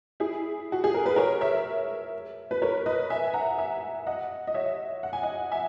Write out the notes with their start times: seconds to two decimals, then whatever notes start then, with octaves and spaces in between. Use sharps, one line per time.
0.20 E4 G#4
0.72 F#4
0.84 G#4
0.94 A#4
1.06 B4
1.16 A#4 C#5
1.41 C#5 E5
2.51 B4
2.62 A#4 C#5
2.86 B4 D#5
3.10 E5 G#5
3.27 G#5
3.34 F#5 A#5
3.58 E5 G#5
4.07 D#5 F#5
4.47 D#5
4.54 C#5 E5
5.03 F#5
5.13 G#5
5.23 D#5 F#5
5.52 E5 G#5